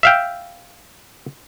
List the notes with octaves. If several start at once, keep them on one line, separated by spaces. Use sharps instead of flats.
E5 F5 G5